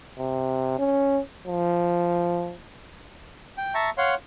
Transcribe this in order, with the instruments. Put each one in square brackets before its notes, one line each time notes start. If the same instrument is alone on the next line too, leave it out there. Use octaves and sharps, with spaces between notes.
[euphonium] C3
C#4
F3
[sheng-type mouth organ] G5
E5 A5 A#5 C#6
C#5 F5 F#5 C6